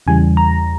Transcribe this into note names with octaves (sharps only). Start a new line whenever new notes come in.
E2 C#3 E3 G3 G#5
A#5